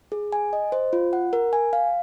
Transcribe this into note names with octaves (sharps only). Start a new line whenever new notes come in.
G#4
G#5
D#5
C5
F4
F#5
A#4
G#5
F5